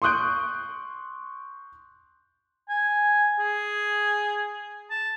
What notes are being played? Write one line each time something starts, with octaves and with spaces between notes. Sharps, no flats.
C6 C#6 D#6 F#6 G6 D7
G#5
G#4
A5